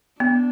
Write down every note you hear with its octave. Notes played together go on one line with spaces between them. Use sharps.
B3 D4